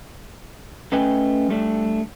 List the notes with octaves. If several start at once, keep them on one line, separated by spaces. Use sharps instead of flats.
A3 C#4 B4 D#5 G5 G#5
G3 A3 D4